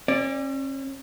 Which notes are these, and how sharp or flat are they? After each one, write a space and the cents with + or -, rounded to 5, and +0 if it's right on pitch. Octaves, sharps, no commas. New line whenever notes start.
C#4 -40 D5 +0